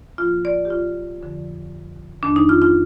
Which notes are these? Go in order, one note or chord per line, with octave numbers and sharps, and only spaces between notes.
A2 F3 A#3 F4
D5
G4
F4
F2 D3 F3
F2 D#3 A#3 D4
D#4
F4
F4